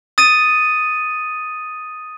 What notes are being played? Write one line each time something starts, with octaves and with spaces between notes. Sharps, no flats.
D#6 A6 D#7